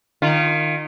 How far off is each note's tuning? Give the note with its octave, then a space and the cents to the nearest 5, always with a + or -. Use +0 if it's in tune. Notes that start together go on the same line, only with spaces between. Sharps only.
D#3 -25 F4 -15